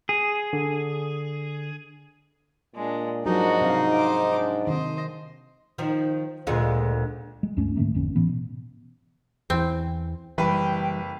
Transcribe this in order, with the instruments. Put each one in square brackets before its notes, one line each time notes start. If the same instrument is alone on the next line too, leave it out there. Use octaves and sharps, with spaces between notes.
[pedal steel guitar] G#4
[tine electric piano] D3
[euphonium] A#2 [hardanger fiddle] G#3 D4
[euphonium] G#2 [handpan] F3 F#3 A#4 [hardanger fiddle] D4 F#4 [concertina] D#4
[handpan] C3 F5
[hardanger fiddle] C5 D6 [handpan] F5
[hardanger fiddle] D4
[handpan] C3 D#3 [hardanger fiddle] C5 D#5
[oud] D#3 F3
[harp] D2 A#2 [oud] G#3 F4
[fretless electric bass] G#3
C#2 G2 A3 C#4
G#2 D3 A3 A#3
G#1 F2 D3 C#4
A2 E3 B3
B2
[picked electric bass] E2 E3 [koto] C4
[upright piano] F#1 B4 [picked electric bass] E3 G3 [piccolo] G5